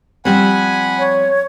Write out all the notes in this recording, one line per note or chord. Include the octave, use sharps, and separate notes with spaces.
F3 G3 C4 F#5 G#5 B5
C#5